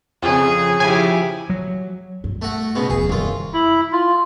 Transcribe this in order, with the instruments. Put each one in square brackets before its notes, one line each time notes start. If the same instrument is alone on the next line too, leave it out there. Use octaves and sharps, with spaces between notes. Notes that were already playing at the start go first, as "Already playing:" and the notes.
[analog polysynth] F2 C#3 [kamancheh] G#4
[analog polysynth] C#3 [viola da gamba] F3 E4 G4 [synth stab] G#5
[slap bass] F#3
[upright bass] G2
[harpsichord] A3 F#4
C#2 B2 B3
[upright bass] D#1 F3 [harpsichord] G#4
[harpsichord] C2 F4 [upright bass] F#2 D#3
[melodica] E4
F4